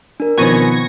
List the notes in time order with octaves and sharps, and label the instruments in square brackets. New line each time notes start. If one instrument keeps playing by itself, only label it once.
[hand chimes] D4 A#4
[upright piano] B2 D#3 F3 [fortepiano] B3 C4 [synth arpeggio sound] G#5 C#6 A#6